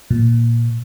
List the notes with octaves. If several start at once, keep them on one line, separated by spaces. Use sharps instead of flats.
A#2